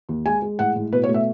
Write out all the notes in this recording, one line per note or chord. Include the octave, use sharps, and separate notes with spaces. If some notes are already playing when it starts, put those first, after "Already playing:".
D#2
G#3 G#5
G#3
A2 F#5
A2
B2 B4
C#5
A3
E5